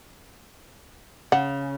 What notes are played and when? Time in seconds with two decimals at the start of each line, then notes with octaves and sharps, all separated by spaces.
1.32 C#3 F#5